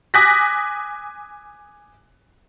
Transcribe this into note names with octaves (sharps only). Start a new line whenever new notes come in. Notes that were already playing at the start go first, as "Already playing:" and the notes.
G#5 D6 D#6 F#6 A#6 B6